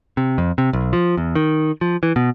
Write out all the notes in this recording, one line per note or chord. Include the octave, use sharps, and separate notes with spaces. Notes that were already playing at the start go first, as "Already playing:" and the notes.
C3
F2
C3
B1
F3
E2
D#3
F3
E3
B2